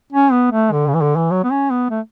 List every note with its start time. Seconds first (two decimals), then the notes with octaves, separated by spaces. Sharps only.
0.12 C#4
0.32 B3
0.52 A3
0.72 D3
0.87 C#3
0.94 E3
1.01 D3
1.16 E3
1.31 F#3
1.44 B3
1.51 C#4
1.70 B3
1.90 A3